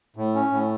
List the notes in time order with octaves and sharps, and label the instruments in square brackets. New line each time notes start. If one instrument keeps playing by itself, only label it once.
[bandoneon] A2
C#4
A2